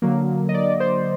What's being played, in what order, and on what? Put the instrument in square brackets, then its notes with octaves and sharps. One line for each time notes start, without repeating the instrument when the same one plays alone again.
[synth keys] D3 F#3 A#3
D#5
D5
C5